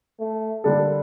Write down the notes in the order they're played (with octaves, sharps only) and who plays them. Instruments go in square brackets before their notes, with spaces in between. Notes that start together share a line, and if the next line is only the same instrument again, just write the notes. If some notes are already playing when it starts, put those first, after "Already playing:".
[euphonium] A3
[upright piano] D3 G3 D4 A4 [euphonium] A#3